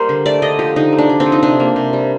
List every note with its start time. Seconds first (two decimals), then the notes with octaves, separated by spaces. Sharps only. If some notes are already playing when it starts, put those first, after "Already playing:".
Already playing: G3 A#3 A#4 C5
0.09 D3
0.26 A3 D5
0.42 D3 D#5
0.59 F3 G4
0.76 D3 D#4
0.92 A3
0.98 D4
1.09 D3
1.20 C4
1.26 F3
1.32 D#4
1.43 C3 D4
1.60 A#3
1.76 C3
1.93 G3